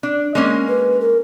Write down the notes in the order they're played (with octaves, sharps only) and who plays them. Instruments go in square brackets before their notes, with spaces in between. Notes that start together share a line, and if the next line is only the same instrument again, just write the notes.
[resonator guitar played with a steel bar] D4
G#3 A#3 C#4
[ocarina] B4
A#4